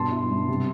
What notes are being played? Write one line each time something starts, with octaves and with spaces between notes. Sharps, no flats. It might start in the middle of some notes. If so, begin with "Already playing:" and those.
Already playing: G2 B2 A5 C6
E4
G2
C3